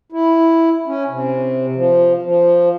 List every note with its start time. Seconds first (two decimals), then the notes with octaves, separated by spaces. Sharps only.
0.12 E4
0.87 C#4
1.08 C3
1.76 F3
2.22 F3